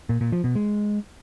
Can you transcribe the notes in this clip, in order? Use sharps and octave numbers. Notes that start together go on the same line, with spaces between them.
A#2
A#2
F3
B2
G#3